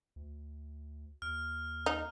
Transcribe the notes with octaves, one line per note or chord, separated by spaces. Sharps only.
D2
D#2 F6
D#4